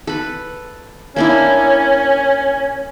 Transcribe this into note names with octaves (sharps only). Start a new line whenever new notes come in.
A4 B4
A#3 C#4 D4 E4